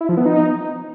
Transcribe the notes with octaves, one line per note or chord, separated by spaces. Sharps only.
E4
F3
B3
D#4